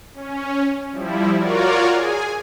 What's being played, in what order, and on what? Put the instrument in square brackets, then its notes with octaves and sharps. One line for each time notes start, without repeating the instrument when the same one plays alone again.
[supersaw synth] C#4
F3 G3 E4
F4 F#4 A#4 C#5 D5
G#4 G#5